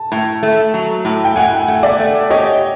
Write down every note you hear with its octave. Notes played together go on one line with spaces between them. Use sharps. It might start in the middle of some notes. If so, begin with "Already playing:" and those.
Already playing: A5
A2
A3
F#3
A2
G5
A2 F#5 G#5
A3
D5 E5
A3
G4 C#5 D#5